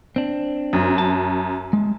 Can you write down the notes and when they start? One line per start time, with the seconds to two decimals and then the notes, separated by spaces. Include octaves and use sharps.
0.16 C4 D4
0.73 F#2
0.98 A5
1.73 G#3